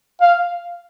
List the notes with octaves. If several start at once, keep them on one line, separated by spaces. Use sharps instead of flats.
F5